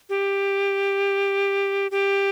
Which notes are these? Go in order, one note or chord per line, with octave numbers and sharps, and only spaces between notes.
G4
G4